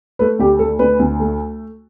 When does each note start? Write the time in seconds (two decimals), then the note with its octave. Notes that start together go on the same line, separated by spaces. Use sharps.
0.19 A3 B4
0.39 D2 G4
0.59 A3 A4
0.79 D2 B4
0.99 D2
1.20 A3